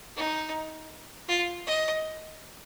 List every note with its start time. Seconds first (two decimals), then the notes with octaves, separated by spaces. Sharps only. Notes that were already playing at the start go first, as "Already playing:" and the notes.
0.16 D#4
1.28 F4
1.66 D#5